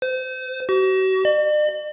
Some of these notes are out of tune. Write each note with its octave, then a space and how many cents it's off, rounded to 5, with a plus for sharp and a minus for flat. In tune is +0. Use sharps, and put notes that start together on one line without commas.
C5 -30
F#4 +40
D5 +45